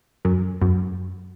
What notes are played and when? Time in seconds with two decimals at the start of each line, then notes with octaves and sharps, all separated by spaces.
0.25 F#2
0.62 F#2